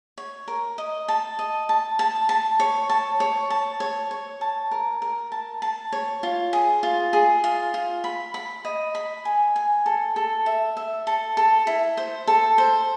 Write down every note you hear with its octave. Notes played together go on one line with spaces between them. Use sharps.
C#5
A#4
D#5
A5
D#5
A5
A5
A5
C#5
A5
C#5
A5
C#5
C#5
A5
A#4
A#4
A5
A5
C#5
F4
G#4
F4
G#4
F4
F4
B5
B5
D#5
B5
G#5
G#5
A4
A4
E5
E5
A4
A4
E4
C5
A4
C5